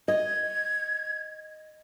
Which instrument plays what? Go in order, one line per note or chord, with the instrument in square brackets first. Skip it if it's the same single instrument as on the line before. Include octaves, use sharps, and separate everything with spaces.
[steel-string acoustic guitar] D#5 [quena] G#6